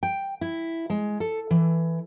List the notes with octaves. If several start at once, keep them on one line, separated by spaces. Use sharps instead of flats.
G5
E4
G#3
A4
E3